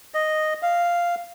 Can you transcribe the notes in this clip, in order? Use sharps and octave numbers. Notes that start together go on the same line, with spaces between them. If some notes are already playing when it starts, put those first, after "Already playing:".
D#5
F5